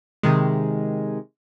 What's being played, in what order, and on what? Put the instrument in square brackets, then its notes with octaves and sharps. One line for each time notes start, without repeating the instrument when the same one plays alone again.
[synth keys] C3 D#3 G#3